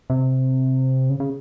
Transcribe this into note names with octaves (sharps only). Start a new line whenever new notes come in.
C3
C#3
C#3